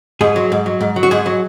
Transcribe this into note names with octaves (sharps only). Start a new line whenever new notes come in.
G#2 G#4
F#3
G#2
F#3
G#2
F#3
F#4
G#2 G#4
F#3